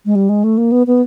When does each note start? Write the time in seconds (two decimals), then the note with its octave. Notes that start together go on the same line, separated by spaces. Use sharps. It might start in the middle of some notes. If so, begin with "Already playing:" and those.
0.06 G#3
0.15 G3
0.29 G#3
0.44 A3
0.58 A#3
0.72 B3
0.87 B3